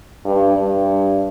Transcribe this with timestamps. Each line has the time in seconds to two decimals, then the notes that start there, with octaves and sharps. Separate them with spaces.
0.25 G2
0.58 G2